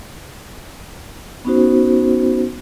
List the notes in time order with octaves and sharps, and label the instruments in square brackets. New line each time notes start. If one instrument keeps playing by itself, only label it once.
[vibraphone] B3 C#4 D#4 F#4 C5